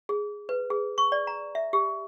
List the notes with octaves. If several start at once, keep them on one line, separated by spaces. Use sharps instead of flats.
G#4
B4
G#4
C#6
D5
A#5
E5
G4